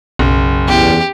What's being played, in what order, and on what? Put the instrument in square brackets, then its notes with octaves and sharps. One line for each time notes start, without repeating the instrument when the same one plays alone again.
[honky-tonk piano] F#1 [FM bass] B1
[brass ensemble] E2 [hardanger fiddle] G4